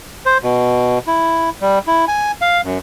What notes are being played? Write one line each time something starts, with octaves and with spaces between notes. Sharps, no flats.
C5
B2
E4
G3
E4
G#5
F5
F#2